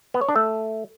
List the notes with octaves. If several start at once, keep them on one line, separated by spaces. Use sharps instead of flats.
B3
C#5
D4
A3